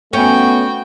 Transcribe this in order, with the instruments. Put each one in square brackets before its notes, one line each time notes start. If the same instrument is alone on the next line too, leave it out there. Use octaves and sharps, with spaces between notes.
[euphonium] A3 [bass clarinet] B3 [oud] C#4 [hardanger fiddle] F#4 G5